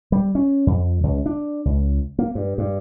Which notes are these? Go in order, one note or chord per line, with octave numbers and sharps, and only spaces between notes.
G3
C#4
F2
C#2
D4
C#2
A#3
G2
G2